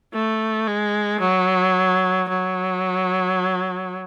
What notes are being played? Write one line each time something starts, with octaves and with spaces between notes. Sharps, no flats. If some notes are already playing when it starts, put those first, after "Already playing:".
A3
G#3
F#3
F#3